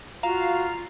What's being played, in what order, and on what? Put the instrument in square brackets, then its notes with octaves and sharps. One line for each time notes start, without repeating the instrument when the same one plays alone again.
[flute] F4 [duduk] F#4 [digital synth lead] F5 [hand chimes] A#5